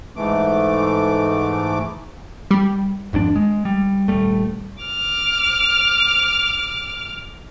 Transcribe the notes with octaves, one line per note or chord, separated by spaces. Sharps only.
G#2 E3 A3 D6
G3
G#1 F2 C#4 D4
G#3
G3
D#1 G3 A3
D6 F6